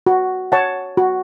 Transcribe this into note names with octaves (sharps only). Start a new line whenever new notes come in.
F#4
C#5 F#5 A5
F#4